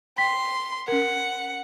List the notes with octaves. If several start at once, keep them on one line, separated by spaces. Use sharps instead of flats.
G5 C6 B6
C#4 A#4 F#5